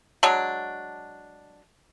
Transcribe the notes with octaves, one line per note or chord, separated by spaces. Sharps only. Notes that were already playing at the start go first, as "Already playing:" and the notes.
F#3 G#3 D4